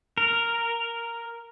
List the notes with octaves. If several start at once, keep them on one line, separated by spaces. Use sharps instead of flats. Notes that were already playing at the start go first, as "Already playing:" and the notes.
A#4